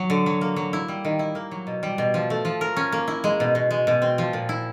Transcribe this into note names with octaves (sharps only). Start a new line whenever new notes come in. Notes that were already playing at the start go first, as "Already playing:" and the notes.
Already playing: F#3
D3
F#3
A#3
F#3
E4
G3
D#3
E4
A#3
F#3
B2
G3
B2
F3
A3
F3
A#4
C#4
A#3
E4
G#3
B2
B2
G#3
B2
C4
F3
A#2
E4